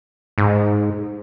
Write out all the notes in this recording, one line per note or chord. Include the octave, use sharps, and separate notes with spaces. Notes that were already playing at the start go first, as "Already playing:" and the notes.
G#2